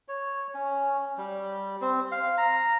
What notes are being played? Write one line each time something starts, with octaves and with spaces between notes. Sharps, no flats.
C#5
C#4
G3
C4
F5
A#5